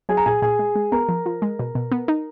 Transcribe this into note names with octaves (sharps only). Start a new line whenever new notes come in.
F#3 G#4 G#5
A#5
A#2 G#4 G#5
A#2 G#4 G#5
G#3
G#3
B3 A#4 A#5
F3
F3
G#3
B2
B2
B3
D#4